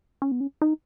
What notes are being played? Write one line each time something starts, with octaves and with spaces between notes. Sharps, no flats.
C#4
B3
C#4
D#4